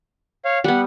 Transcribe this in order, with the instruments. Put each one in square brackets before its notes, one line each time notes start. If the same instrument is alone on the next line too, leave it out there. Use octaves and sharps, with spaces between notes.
[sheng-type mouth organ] C#5 F5
[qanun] G3 B3 [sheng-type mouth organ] F#5